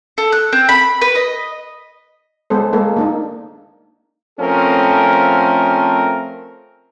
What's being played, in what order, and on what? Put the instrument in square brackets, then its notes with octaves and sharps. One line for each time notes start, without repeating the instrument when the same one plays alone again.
[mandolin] A4
F#6
C4
B5
B4
D#5
[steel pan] G#3 B3 A4 C5
G#3 A#3 A4
A#3 D4 D#4
[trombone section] F3 A3 C4 C#4 A4 A#4